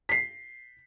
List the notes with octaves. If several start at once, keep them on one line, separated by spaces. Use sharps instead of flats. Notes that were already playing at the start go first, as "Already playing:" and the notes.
B6 C7